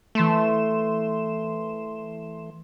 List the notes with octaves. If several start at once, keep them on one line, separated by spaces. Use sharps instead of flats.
E3 A3 C6 E7